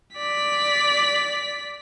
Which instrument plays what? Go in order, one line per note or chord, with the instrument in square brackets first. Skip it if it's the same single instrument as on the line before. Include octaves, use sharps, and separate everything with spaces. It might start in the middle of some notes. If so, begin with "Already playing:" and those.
[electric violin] D5 B6